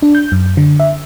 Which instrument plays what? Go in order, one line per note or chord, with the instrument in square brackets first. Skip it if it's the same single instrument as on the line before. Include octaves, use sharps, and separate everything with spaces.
[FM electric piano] D4
G6
F#2
D3
E5